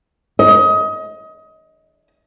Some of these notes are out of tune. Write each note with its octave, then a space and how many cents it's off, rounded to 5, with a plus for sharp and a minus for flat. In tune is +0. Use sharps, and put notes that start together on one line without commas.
D#5 +25